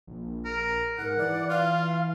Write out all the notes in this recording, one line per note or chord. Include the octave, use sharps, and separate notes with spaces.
A#1
A#4
G#2 A#4 F#5
E3 D5
F4 F5